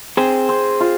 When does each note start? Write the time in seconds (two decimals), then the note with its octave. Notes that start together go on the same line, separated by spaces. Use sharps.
0.17 C4 G#4 C5
0.49 C4
0.80 F4